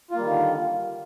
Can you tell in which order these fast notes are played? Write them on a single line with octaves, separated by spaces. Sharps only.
F4 A#3 G3 D#3 D3